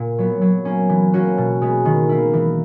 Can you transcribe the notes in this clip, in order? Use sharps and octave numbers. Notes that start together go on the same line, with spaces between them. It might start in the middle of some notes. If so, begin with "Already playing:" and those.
Already playing: A#2
F#3 B3
F#3
A#3 C#4
E3
A#3 C#4 F#4
B2
G#3 B3
D#3
A#3 E4
E3